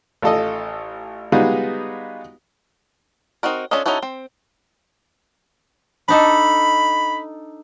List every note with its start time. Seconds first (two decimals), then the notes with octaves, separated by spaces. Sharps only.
0.22 A1 F4 A4 D#5
1.32 G3 G#3 B3 D#4 F4 F#4
3.43 C4 D#4 F#4 A#4
3.71 C#4 D4 F4 A4 D#5
3.86 C#4 D#4 E4 F#4 A4
4.02 C4
6.08 D4 D#4 A4 B5